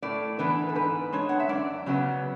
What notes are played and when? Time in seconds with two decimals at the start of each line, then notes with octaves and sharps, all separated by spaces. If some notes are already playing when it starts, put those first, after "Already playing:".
0.02 A2 D5
0.39 E3 B3 D4 B4
0.69 A4
0.75 G#2 B4
1.12 G#3 D4 C#5
1.29 F#5
1.40 E5
1.49 F#2 D5
1.86 C#3 F#3 B3